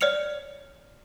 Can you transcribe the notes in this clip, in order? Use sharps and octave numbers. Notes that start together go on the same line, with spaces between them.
C#5 D5 F6 C#7 F7